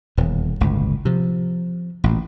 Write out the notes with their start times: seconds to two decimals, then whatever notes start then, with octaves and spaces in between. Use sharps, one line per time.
0.17 D#1 E2 B2
0.61 G1 C#2 A2
1.05 C3 F3
2.04 A1 A#2